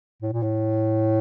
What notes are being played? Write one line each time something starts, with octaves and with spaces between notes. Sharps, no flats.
A2
A#2
A2